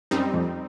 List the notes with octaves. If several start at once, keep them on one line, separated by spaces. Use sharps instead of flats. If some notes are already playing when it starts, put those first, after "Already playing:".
F#2 G3 C4 D#4
F2